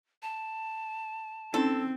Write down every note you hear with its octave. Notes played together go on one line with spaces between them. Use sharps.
A5
C4 C#4 D#4 E4 A4